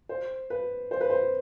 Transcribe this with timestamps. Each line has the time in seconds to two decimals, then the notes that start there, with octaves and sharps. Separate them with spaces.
0.09 C5
0.50 B4
0.91 C5
1.01 B4
1.10 C5